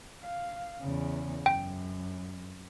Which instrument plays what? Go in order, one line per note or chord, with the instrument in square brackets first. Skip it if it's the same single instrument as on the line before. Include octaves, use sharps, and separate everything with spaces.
[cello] F5
E2 C#3
[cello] F#2 [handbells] G5